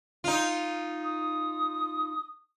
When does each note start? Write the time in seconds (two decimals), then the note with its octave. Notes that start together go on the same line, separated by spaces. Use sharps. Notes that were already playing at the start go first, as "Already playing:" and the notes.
0.24 D#4 F4
1.03 D#6